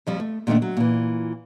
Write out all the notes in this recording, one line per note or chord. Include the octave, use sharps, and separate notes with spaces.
F2 F3 G3
A3
A#2 D#3 G3 A3 D4
F#3
A#2 E3